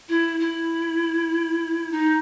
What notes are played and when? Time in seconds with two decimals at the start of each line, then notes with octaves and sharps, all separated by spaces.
0.09 E4
0.40 E4
1.91 D#4